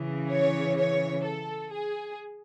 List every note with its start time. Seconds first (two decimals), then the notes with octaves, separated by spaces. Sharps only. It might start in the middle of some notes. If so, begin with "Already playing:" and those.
Already playing: C#3 E3
0.30 C#5
0.77 C#5
1.24 A4
1.71 G#4